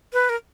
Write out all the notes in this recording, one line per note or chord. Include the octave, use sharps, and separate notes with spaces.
B4
A#4